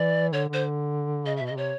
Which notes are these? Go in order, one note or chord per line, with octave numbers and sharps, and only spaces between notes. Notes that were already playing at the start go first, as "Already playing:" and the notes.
Already playing: E3 D5
D3 C#5
D3
C5
C#3 D#5
E5
B2
D#5
C#3
C3 C#5